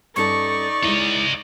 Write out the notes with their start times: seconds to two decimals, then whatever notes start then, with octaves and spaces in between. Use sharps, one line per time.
0.16 G2 C#4 D#4 A4 D5 C#6
0.83 G#3 E4 C#5 D#5